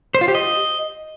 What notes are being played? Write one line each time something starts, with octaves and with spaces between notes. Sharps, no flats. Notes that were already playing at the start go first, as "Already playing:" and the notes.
C5
F4
G4
D#5